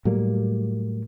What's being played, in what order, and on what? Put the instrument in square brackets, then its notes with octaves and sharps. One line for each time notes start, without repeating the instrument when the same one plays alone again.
[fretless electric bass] A2 F#3 G3 A#3